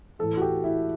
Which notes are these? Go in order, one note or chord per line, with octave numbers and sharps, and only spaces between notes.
A2 E3 A4
F#4
G4
E4